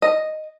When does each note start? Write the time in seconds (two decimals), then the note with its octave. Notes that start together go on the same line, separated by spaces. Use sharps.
0.02 D#5